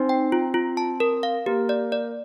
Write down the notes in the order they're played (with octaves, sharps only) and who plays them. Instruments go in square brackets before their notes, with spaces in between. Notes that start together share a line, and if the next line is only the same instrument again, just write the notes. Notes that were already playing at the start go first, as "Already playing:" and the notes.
Already playing: [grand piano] C4 C5 [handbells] D#4
[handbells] G5
F4
F4
A5
A#4
F5
[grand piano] A#3 A#4 [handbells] G4
[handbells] D5
D5